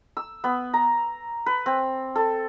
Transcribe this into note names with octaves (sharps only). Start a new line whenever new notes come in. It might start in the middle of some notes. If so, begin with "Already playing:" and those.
E6
B3
A#5
B4
C4
A4